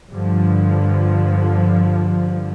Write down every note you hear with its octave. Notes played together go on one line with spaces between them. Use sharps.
G2 D3 F3